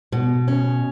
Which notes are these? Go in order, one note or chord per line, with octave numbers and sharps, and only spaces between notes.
B2
C#4